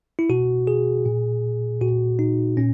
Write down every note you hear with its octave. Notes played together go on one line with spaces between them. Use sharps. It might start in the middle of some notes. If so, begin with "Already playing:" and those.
E4
B2 F#4
G#4
A#2
A#2 F#4
D#4
A#2 C#4